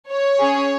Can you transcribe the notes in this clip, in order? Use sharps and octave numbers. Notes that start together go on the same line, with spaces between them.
C#5
C#4 G#4